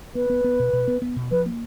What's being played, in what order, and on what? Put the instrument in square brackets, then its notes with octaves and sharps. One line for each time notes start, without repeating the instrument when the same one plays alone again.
[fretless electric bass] B3 [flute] B4
[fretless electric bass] B3
B3
B2
B2
B3
B3
B2
[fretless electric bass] F3 [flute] B4
[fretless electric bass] A#3